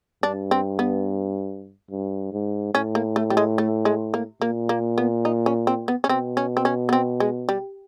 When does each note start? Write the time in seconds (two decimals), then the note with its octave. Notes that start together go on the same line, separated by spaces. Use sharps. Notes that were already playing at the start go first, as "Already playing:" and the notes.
0.23 G2 D4
0.51 C4
0.79 B3
1.91 G2
2.32 G#2
2.74 A2 C#4
2.95 A#3
3.16 A3
3.30 G3
3.37 G#3
3.58 A3
3.85 G#3
4.14 A#3
4.42 A#2 A#3
4.69 A#3
4.98 B3
5.25 D#4
5.46 C#4
5.67 C4
5.88 B3
6.04 C#4
6.09 B2 C4
6.37 C#4
6.57 C4
6.65 C#4
6.89 B3
6.93 C4
7.20 G#3
7.49 G3